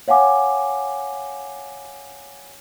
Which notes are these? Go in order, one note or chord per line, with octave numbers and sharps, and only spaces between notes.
C#5 F5 F#5 G#5 D6